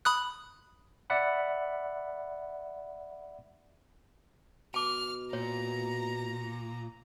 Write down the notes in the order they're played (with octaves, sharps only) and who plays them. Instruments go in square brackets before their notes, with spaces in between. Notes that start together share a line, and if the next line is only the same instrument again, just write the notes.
[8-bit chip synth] B5 D#6 F#6
[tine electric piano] D5 E5 F#5 B5
[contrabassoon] B2 [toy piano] A5 D6 [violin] F6
[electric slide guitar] A#2 [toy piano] C#5 [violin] A#5